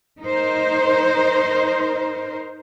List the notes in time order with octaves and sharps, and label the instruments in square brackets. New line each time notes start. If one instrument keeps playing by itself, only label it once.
[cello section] D#4 A#4 C5